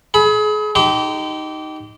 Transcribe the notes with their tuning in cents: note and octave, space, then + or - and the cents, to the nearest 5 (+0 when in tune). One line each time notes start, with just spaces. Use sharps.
G#4 +35 B5 +0
D#4 +0 G4 -25 C6 -40